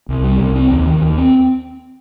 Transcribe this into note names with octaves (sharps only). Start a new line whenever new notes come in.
C2
G3
C2
C4
D#2
D#3
D#2
C4